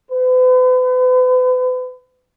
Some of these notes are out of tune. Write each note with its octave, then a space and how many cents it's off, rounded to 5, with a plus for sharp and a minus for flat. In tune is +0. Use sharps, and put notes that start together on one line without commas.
B4 +40